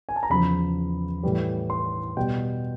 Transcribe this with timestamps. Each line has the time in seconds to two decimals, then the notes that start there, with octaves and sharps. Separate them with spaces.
0.09 G#5
0.16 A5
0.23 A#5
0.30 E2 C#3 F3 B5
1.23 A2 E3 G3
1.70 C6
2.17 B2 G3 G5